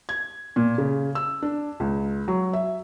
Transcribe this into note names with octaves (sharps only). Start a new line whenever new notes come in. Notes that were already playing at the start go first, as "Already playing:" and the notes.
G#6
A#2
C#3
E6
D4
C#2
F#3
E5